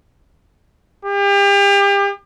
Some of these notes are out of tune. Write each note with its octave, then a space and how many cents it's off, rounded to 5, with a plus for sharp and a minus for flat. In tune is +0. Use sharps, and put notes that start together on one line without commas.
G4 +35